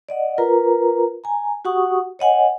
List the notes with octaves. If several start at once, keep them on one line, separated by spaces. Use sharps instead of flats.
D5 D#5 F#5
F4 A#4 B4 A#5
G#5 A#5
F#4 G4 F#5 C#6 D#6
C#5 D#5 F#5 G#5